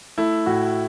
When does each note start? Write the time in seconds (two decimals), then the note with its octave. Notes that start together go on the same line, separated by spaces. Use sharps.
0.18 A3 E4
0.46 A2 F#4